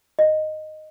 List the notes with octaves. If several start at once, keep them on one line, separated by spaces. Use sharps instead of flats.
D#5